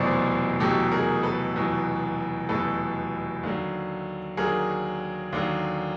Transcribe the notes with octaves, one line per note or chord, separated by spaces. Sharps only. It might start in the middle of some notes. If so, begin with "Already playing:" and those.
Already playing: F1 E2 B2 F#3 C5 D5
F1 E2 B2 F#3 G4 A4
G#4 A#4
A4 B4
F1 E2 B2 F#3
F1 E2 B2 F#3 A4 B4
D#2 D3 F#3
D#2 D3 F#3 G#4 A#4
D#2 D3 F#3